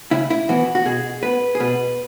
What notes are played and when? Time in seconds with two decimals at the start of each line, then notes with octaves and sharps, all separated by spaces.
0.11 C#3 E4
0.30 E4
0.49 E3 B3 F#4
0.75 F#4
0.85 B2 G#4
1.23 B3 B4
1.55 G#4
1.60 B2 B4